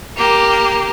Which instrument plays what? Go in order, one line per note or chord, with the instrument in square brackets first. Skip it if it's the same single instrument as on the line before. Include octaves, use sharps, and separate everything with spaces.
[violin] A#3 G4